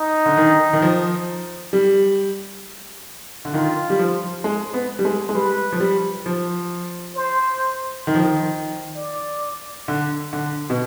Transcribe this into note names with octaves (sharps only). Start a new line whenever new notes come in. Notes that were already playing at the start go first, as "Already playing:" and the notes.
Already playing: D#4
D3
D#3
D#3
F3
G3
D3
D#3 F4
G3
F3
G#3
B3
G3
G#3
G#3
G3 B4
F3
G3
F3
C5
D#3
F3
D#3
D5
D3
D3
B2